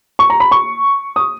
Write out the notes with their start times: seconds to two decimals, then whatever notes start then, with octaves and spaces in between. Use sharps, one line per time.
0.19 C#6
0.30 A#5
0.40 B5
0.52 C#6
1.16 D#6